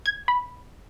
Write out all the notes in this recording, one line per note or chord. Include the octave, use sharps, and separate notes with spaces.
G#6
B5